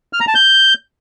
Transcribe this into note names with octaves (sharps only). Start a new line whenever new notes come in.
F6
A#5
A5
G6